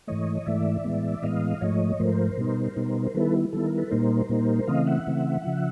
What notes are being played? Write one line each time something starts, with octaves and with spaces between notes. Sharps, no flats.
G#2 E3 A3 C#5 D#5
G#2 E3 A3 D5 E5
A2 E3 G#3 B3
A2 E3 G#3 B3 D#5 F5
G#2 F3 A3 C#5 D#5
G#2 F3 A3 A#4 C5
B2 G3 B3 D#4
B2 G3 B3 D#4
D#3 G3 B3 E4 A4 B4
D#3 G3 B3 E4 A4
A#4
A4 B4
A#2 G3 A#3 D#4 A#4 C5
A#2 G3 A#3 D#4
C#3 E3 A3 C4 D#5 F5
E5 F#5
C#3 E3 A3 C4
C#3 F3